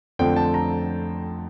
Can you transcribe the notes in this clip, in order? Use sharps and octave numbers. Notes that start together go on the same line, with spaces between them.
F2 D3 F3 A3 C4 G5
A5
A#5